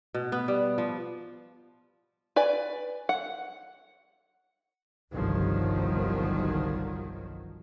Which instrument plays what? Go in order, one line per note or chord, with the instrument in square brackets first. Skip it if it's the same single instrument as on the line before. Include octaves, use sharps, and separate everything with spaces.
[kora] B2
B3
G3
F3
[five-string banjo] B4 D5 G#5
F#5
[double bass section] G1 C2 D#3 F3 F#3